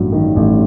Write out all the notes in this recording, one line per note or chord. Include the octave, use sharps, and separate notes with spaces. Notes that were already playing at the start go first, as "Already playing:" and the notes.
Already playing: A1 G2 F#3
D#3
A1